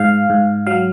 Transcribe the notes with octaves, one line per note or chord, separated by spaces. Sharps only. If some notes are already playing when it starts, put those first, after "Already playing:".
Already playing: G#2 F5
G#2
F#3 F5